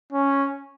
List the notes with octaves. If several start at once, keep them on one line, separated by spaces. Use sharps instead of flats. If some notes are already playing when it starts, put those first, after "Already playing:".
C#4